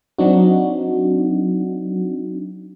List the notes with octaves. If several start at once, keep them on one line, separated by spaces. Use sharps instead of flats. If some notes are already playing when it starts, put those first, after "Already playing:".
F#3 C4 D4 D#4 F#4